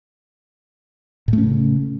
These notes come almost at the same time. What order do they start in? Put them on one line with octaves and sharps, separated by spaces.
A2 A3 C#4 C#3